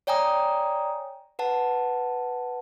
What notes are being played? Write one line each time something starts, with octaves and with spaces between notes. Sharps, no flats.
C#5 D5 G5 G#5 A#5 D#6
B4 F#5 A5